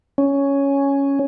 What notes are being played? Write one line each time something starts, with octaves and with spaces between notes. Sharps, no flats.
C#4